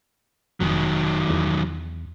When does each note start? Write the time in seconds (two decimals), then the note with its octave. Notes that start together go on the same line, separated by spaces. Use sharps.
0.60 F1 D#3 F#3
1.30 E2